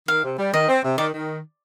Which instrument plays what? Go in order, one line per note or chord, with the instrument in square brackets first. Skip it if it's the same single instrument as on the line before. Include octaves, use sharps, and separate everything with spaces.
[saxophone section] D#3 [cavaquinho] F5
[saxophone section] C3
G3
[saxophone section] D#3 [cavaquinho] D#5
[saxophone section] C4
C3
[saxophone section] D#3 [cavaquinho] D5
[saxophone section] D#3